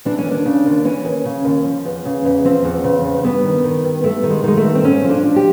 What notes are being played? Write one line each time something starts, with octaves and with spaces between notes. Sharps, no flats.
E3 D4
C#4
D#2
D4
C#3
D#2
E3 C#4
D#2
C#3
D#2
F3
E2
C#3
E2
F3 C4
E2
C#3
E2
G2 B3
D#3
D#3
G2
G2 A3
D#3
G#3
D#3 G#3
A3
G2
C4
G#2 C#4
F3
D4
F3
G4